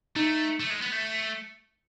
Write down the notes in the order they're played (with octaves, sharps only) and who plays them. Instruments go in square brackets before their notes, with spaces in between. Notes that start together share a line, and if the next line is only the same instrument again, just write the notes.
[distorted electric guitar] A3 [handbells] D#4
[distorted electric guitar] A3
G#3
B3
A3